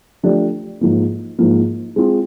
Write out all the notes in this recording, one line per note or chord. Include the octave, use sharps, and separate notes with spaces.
F3 A3 D4 G4
G#2 F3 A#3
G#2 F3 A#3
G#3 C4 F4